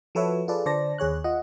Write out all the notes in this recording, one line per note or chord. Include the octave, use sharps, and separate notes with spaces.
F3 F#4 A4 B4 C#5 E5
F4 G#4 A4 B4 D5
D3 C5 D5 A5 A#6
D#2 G#4 C#5 F#6
F4 D#5 F#5